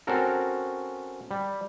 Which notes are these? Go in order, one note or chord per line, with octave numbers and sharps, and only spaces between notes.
C4 C#4 F#4 A4 A#4
G3